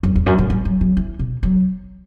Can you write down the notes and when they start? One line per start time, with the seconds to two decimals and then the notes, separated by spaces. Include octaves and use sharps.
0.03 F#2
0.16 E2
0.26 F#2
0.38 A2
0.50 G3
0.65 F#3
0.81 F#3
0.97 E3
1.19 B2
1.43 F#3